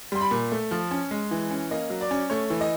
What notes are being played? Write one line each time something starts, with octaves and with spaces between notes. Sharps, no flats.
G3 C6
B5
A#2
A3
F3
C#4
G#3
E3
C#4
A#3 D#5
F#3
D5
C#4
A3 C#5
E3
D#5